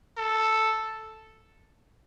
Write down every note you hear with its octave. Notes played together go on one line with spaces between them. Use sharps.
A4